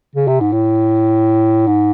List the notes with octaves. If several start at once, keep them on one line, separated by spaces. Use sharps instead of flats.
C#3
C3
G#2
A2
G#2